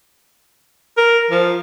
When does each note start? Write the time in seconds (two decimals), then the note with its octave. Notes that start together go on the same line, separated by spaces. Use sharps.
0.97 A#4
1.31 F3